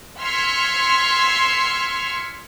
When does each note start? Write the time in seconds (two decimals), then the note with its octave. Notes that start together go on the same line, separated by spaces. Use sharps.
0.22 C6 E6 F6 G#6 B6 C#7